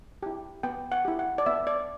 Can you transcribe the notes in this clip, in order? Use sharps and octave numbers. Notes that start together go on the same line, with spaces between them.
E4 G4
B3 G5
F#5
E4 G4
F#5
D5
B3 E5
D5